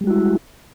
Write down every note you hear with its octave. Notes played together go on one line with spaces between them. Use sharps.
G3 G#3 E4 F#4